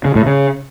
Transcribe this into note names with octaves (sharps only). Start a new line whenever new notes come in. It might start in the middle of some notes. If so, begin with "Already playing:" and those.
C#3
A2
C#3